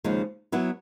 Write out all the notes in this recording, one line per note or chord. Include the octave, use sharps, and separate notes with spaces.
D#2 C#3 F3 G#3
F#3 B3 E4